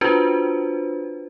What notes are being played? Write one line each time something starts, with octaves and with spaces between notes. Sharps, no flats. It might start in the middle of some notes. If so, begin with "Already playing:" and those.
D4 F4 F#4 B4 C5